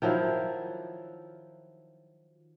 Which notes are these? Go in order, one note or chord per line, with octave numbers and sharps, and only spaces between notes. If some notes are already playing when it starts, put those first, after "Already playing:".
D#3 F3 F#3 E4